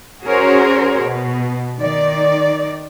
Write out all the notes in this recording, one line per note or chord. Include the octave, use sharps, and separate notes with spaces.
C#4 F#4 G#4 A#4 C5 C#5
B2
D#3 D5